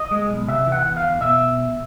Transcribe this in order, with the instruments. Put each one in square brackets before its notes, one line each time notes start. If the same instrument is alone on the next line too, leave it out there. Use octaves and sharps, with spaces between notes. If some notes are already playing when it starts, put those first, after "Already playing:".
Already playing: [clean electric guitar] D#5
G#3
B1
C3 E5
E3
F#5
E2
F5
E2
B2 E5